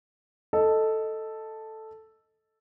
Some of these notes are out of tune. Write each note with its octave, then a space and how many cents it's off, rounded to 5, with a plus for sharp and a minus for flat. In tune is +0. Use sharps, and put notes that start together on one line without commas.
A4 +0 D#5 +0